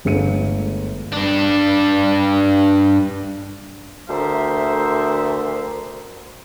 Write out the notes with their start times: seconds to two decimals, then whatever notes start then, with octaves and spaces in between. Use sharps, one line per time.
0.05 G1 G#3 A3 C#7 D#7
1.12 G2 D4
4.09 D2 A#4 C5 E5